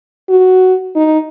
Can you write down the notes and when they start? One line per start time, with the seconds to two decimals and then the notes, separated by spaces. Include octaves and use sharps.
0.29 F#4
0.95 D#4